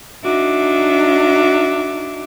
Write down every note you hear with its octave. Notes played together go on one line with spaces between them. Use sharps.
D4 D#4 F#4 E5 D6